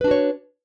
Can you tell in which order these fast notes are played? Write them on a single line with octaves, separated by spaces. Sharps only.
B4 D4 F#4 C#5